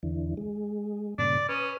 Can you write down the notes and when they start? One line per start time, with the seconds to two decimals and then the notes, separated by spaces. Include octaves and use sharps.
0.03 E2 D3 E3
0.37 G#3
1.19 G2 A#2 C#3 D5
1.49 C#4 B4 D#6